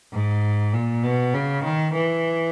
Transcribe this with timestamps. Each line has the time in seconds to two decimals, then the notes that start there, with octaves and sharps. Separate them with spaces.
0.13 G#2
0.73 A#2
1.03 B2
1.34 C#3
1.64 D#3
1.94 E3